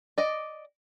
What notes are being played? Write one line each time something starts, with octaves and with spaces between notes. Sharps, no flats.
D5 D#5